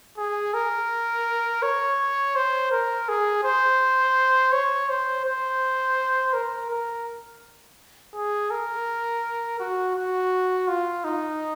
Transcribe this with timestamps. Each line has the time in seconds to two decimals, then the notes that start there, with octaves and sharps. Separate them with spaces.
0.18 G#4
0.54 A#4
1.62 C#5
2.36 C5
2.71 A#4
3.09 G#4
3.44 C5
4.53 C#5
4.89 C5
5.25 C5
6.33 A#4
6.70 A#4
8.14 G#4
8.51 A#4
9.60 F#4
9.96 F#4
10.68 F4
11.05 D#4